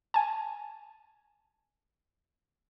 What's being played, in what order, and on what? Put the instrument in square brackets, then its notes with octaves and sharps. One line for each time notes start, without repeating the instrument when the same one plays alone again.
[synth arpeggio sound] G#5 A5